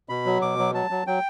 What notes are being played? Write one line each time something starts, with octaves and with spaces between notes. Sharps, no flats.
B2 B5
F#3
B2 D6
F#3
F#3 A5
F#3
F#3 G5